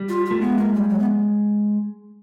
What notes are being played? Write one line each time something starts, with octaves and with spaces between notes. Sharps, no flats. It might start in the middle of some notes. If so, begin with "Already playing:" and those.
Already playing: G3
F4
A3 F4
G#3 B3
A#3
G3
F#3
B3